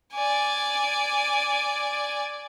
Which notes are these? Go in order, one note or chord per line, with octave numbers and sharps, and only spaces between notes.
D5 G#5